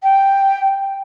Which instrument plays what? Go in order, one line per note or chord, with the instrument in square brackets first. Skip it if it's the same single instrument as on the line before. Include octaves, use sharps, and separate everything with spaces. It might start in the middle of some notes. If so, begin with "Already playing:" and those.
[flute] G5